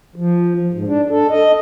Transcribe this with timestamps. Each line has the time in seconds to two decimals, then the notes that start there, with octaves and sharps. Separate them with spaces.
0.16 F3
0.73 G#2
0.87 D4
1.10 A4
1.30 D#5